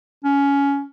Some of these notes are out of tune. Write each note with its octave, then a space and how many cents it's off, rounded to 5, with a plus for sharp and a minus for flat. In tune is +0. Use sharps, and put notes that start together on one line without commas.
C#4 +15